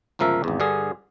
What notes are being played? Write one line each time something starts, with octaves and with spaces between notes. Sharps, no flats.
G1 C#2 F3 A#4 E5
G#1 E2
G2 D3 G#4